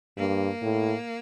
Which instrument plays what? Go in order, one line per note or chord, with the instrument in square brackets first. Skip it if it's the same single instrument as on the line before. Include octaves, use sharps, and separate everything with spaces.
[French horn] G2 [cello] A#3
[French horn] A2